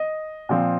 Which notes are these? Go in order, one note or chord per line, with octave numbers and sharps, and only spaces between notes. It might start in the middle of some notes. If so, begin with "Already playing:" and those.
Already playing: D#5
A#2 F3 C4